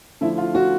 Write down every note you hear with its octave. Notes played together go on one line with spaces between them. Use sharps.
D3 F3 A3 E4
F4
F#4